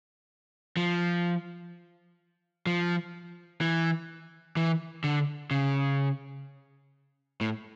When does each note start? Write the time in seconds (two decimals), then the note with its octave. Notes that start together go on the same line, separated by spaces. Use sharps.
0.77 F3
2.66 F3
3.61 E3
4.57 E3
5.04 D3
5.51 C#3
7.41 A2